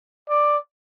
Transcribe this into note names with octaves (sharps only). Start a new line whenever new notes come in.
D5